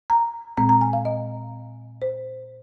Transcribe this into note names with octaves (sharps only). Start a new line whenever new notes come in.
A#5
A#2 G#3 C4 A#5
A#5
G#5
F5
D#5
C5